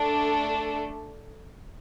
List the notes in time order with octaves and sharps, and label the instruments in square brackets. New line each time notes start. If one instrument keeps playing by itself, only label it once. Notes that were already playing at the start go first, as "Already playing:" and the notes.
Already playing: [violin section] A3 D4 A4